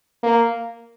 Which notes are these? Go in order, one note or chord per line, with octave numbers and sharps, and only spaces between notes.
A#3